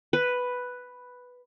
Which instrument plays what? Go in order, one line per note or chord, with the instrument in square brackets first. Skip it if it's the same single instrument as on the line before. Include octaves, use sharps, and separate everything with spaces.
[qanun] B4